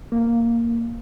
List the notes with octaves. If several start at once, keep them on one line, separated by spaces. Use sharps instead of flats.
A#3